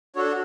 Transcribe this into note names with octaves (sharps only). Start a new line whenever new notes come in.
D4 F#4 A4 C#5